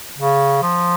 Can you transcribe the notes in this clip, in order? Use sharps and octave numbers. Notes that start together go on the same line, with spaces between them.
C#3
F3